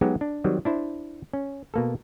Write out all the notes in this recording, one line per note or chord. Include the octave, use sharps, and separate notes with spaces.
F#3 G#3 B3 D#4 F#4 G4
D4
D#3 F#3 G3 C4
D4 E4 C5
C#4
B2 A#3 A4